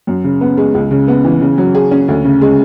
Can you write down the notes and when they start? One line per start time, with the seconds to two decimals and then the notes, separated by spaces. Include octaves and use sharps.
0.07 F#2
0.24 C#3
0.41 B3
0.57 G#3
0.74 C#2
0.91 C#3
1.08 B3
1.25 E3
1.41 C#3
1.58 F#3
1.75 G#4
1.91 C#4
2.08 D2
2.25 C#3
2.41 G#3